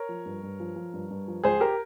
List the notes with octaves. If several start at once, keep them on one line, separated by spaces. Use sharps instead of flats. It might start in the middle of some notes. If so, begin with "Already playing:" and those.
Already playing: A#4 C#5
F3
G2
G2
F3
F3
G2
G2
F3
C#2 G#4 C5
G4 A#4